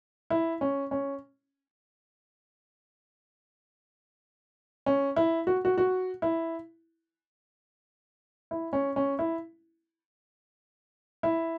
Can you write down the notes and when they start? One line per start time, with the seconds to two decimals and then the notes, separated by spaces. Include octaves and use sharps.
0.30 E4
0.61 C#4
0.91 C#4
4.86 C#4
5.16 E4
5.47 F#4
5.65 F#4
5.78 F#4
6.22 E4
8.51 E4
8.73 C#4
8.96 C#4
9.19 E4
11.23 E4